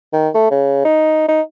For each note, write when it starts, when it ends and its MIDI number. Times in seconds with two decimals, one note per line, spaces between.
0.13 0.28 51
0.34 0.49 57
0.51 0.83 49
0.85 1.27 63
1.28 1.41 63